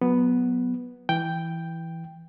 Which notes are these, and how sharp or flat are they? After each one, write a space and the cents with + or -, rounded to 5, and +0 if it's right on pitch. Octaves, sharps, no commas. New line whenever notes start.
F#3 -15 B3 +0
E3 +0 G5 +0